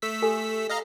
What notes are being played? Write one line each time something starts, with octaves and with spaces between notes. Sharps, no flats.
A3 E6 B6
G4 A4 G#5
D#5 F5 A#5